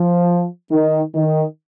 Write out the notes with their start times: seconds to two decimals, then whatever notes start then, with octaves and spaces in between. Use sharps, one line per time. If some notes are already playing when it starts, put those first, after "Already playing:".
Already playing: F3
0.71 D#3
1.14 D#3